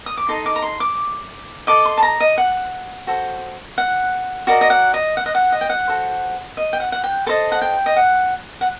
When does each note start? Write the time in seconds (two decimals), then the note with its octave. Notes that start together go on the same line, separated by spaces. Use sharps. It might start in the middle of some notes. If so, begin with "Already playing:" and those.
0.06 D#6
0.17 D6
0.28 D#4 A4 D#5 C6
0.46 D6
0.56 A#5
0.62 C6
0.80 D6
1.67 A4 D#5 D6
1.85 C6
1.98 A5
2.03 A#5
2.20 D#5
2.38 F#5
3.07 F#4 A4 C5
3.78 F#5
4.47 F#4 A#4 D5 D#5
4.61 D#5
4.70 F#5
4.94 D#5
5.17 F#5
5.26 D#5
5.35 F#5
5.52 D#5
5.61 G5
5.70 F#5
5.88 F#4 A4 C5
6.57 D#5
6.73 G5
6.80 F#5
6.92 F#5
7.04 G5
7.27 A4 C5 D#5 A5
7.52 F#5
7.62 G5
7.86 D#5
7.97 F#5
8.61 F#5